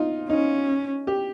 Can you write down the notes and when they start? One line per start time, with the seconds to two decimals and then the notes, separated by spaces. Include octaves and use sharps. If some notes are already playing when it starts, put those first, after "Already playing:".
Already playing: D#4 F4
0.29 C#4 D#4
1.07 G4